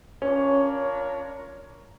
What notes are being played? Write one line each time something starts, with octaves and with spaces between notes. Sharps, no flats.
C#4 D4 F4 A#4 C#5